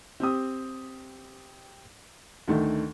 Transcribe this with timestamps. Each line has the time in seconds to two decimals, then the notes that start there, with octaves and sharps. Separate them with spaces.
0.20 C4 G4 D#6
2.48 D2 D#3 A3